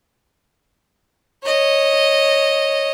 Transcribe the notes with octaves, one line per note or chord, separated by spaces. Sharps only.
C#5 D#5